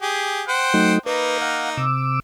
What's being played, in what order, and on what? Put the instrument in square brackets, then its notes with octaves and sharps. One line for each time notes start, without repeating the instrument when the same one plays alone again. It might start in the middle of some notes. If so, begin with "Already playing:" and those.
[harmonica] G4 G#4
C5 F#5 G5
[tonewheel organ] F#3 A3 D#4
[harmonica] A#3 D#4 [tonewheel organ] B4
[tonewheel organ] F5 F#5
C3 D6 E6